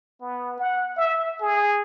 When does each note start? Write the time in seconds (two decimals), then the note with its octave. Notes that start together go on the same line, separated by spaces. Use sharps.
0.21 B3
0.59 F#5
0.97 E5
1.42 G#4